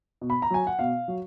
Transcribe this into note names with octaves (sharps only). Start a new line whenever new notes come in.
B2
B5
A#5
F#3 G#5
F#5
B2 F5
F#3